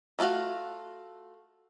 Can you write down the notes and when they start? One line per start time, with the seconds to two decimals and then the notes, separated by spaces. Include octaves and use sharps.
0.19 D#3 A3 F4 F#4 F5